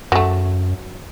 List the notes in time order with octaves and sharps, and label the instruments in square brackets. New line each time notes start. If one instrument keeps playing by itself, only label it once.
[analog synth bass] F#2 [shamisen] F#3 A3